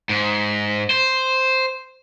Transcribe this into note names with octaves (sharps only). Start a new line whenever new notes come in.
G#2
C5